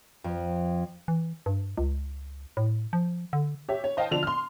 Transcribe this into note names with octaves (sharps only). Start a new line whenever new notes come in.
F2
E3
G2
C#2
A2
F3
D3
G4 C#5 E5
C#5
C5 D#5 F5 G5 A5
D3 F3 D4 F7
C6 F6